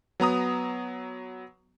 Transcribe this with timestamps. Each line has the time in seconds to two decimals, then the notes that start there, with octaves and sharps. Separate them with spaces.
0.20 F#3 B3 A#5 D#6